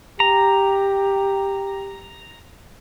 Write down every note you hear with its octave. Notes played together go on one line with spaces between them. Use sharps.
G4 A#5